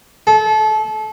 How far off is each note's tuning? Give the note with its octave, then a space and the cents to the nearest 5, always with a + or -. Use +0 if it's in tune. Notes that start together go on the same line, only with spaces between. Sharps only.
A4 -30